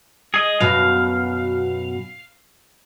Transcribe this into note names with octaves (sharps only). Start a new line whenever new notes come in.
G#4 D#5
F#2 B2 F5